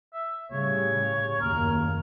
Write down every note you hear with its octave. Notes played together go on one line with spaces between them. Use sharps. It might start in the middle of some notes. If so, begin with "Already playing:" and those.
E5
A2 C#3 G3 C#5
F#1 D#2 A#4